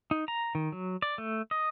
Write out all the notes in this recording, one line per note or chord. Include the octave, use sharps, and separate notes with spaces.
D#4
A#5
D#3
F#3
D5
A3
D#5